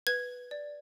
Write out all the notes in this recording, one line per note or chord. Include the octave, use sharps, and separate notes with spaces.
B4 G#6
D5